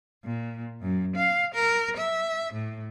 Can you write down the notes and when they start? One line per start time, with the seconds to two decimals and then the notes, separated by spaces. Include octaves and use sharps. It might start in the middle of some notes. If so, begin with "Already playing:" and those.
0.24 A#2
0.82 F#2
1.16 F5
1.55 A#4
1.97 E5
2.53 A2